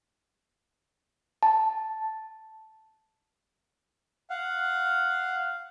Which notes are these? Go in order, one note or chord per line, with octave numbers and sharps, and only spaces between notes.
A5
F5 F#5